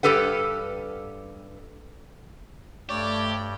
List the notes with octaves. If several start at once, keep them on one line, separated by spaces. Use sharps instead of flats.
G2 F3 G4 A4 B4 F#5
G2 A3 G4 C#5 D5